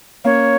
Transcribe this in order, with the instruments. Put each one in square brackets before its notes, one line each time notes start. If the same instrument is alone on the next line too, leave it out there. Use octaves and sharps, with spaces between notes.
[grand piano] A#3 C#4 [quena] C#5